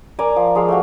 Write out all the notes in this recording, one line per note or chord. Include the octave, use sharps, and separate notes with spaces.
A#4 D5 G#5 A#5
F3
F3 G#3 F5
A3 A#3 F#4